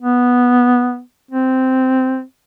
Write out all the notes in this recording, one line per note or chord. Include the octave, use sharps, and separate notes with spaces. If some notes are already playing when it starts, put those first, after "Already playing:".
B3
C4